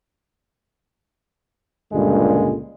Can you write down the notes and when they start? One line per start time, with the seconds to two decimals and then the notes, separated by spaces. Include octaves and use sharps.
1.93 C#2 G2 A#2 D3 G3 G#3